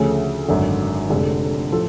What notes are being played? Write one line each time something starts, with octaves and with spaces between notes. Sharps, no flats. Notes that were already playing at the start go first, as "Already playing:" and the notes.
Already playing: D2 C#3 F3 A3 C#4
G#1 F#2 D3
F1 F2 D3 G#3
A2 F3 A3 F4 A4